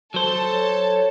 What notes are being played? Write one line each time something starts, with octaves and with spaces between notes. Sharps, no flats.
F#3 A4 C5 A5
C#5